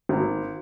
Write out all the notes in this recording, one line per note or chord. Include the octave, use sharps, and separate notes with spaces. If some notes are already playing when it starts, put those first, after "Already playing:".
G#1